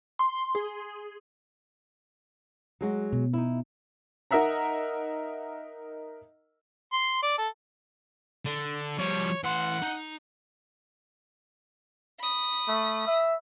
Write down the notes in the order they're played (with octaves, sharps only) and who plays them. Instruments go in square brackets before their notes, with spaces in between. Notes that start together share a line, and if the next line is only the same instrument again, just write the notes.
[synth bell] C6
G#4
[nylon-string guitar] F#3 G#3 F#4
[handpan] B2
[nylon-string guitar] D#4 E4
[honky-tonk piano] D#4 A#4 D#5 E5 F#5 A#5
[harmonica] C6
D5
A4
[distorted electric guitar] D3
[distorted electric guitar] F3 G3 [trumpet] C#5
[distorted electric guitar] E3 C6 [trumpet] F#5
[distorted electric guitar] D#4
[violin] B5 D#6
[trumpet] A3
E5